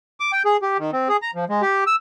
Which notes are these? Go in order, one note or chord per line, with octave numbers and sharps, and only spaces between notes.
D6
G5
G#4
G4
D#3
C4
G#4
A#5
F3
G#3
G4
E6